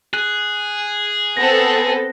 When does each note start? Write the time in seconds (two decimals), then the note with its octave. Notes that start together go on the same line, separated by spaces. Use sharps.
0.14 G#4 F#6
1.37 B3 C4 A4 A#6